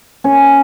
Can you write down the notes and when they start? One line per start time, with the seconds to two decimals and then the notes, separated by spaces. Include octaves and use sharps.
0.24 C#4